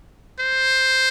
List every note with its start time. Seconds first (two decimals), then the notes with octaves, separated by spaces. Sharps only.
0.40 C5